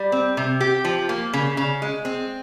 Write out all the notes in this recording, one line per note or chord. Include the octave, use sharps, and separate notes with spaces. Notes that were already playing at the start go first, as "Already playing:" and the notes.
Already playing: G3
C4
C3
G4
F3
A#3
C#3
C#3
G#3
C4